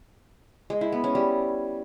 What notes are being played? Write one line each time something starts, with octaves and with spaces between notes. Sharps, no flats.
G#3
E4
B3
C#4
G3